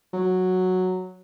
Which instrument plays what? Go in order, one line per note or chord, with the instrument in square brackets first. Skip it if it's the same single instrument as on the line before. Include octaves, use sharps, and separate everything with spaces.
[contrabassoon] F#3